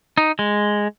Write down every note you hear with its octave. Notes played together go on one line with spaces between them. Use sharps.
D#4
G#3